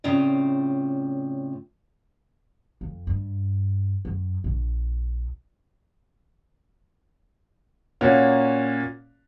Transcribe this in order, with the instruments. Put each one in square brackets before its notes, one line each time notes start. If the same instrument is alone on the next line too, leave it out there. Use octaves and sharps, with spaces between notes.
[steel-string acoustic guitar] A2 C#3 C4 F4 D5
[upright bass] F2
G2
F#2
A#1
[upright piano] A#2 A#3 C#4 F#4